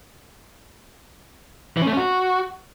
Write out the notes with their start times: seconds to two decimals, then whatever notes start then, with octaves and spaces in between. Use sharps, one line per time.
1.77 E3
1.82 C#4
1.87 A3
1.92 C#4
1.97 F#4